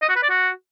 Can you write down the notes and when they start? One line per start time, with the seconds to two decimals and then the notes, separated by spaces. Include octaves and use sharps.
0.02 D#5
0.09 F#4
0.16 B4
0.23 D5
0.30 F#4